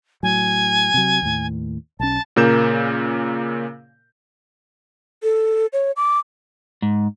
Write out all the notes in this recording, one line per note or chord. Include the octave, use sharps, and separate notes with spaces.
A2 F#3 G#5
C3 F#3
D#2 A2
B1 C#4 A5
A#2 C#3 A#3 A#4 G6 E7
A4
C#5
D6
G#2